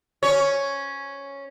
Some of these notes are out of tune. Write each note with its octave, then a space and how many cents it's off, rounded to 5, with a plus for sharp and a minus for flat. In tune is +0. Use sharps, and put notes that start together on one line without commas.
C#4 +0 C#5 +0